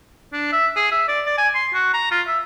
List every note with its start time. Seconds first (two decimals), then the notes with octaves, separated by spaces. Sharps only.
0.33 D4
0.52 E5
0.76 G#4
0.92 E5
1.08 D5
1.26 D5
1.38 G#5
1.55 C6
1.74 F#4
1.93 A#5
2.11 F4
2.27 E5